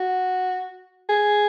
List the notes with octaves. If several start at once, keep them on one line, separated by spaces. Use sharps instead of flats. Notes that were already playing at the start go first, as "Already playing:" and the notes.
Already playing: F#4
G#4